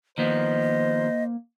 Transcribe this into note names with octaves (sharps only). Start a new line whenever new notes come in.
D#3 F3 A#3 B3 C5 D#5